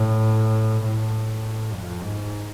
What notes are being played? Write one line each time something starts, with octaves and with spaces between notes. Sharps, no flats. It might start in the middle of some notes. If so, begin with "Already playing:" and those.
Already playing: A2
A2
F2
G#2